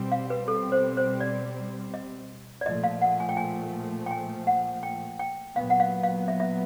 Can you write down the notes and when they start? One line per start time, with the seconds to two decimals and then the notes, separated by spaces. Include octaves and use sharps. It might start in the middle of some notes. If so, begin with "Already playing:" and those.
Already playing: B2 G3 C4
0.12 F5
0.30 B4
0.48 A4
0.72 C5
0.97 C5
1.20 D5
1.94 D#5
2.61 D5
2.66 A#2 F3 A3 D#5
2.84 F5
3.02 F#5
3.20 G#5
3.29 G5
3.37 G#5
4.06 G5
4.11 G#5
4.47 F#5
4.83 G5
5.20 G5
5.55 A#2 F#3 B3 F5
5.70 F#5
5.80 F5
6.03 F5
6.28 E5
6.40 E5